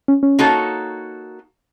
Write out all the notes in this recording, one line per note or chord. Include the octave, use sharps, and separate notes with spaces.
C#4
C#4
A#3 D#4 F#4 A4 C#5